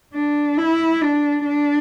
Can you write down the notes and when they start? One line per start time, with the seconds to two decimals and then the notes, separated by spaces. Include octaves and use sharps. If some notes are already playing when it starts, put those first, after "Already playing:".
0.14 D4
0.58 E4
1.01 D4
1.45 D4